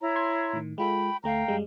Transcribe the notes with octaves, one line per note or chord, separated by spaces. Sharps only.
E4 C#5 A#5
C6 G#6 C7
A2 D#3
G#3 F4 A4 G5 B5
D2 A3 F5 G5 A#5
F#2 G3 G#3